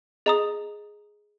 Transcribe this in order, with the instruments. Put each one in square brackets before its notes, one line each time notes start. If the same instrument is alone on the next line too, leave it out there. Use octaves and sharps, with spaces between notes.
[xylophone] G#4 D#5 A#5 D#6